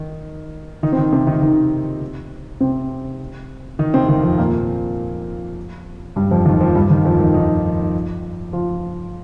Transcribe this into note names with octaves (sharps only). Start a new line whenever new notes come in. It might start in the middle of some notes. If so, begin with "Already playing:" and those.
Already playing: D#3 D#4
D#3 D#4
C4
D#3 D#4
C3 C4
D#3 D#4
D#3 D#4
C3 C4
D#3 D#4
C3 C4
D#2 D#3
F2 F3
A#2 A#3
G2 G3
F2 F3
D#2 D#3
F2 F3
G2 G3
D#2 D#3
F2 F3
D#2 D#3
D#3 D#4
F3 F4